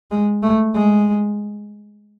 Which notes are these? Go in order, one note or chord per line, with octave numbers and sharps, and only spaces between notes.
G#3
A3
G#3